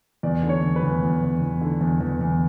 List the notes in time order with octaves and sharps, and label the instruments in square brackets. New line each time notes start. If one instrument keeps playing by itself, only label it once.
[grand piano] E2 D5
D3
C#5
E2
B4
E2
E2
E2
E2
D3
E2
E2
E2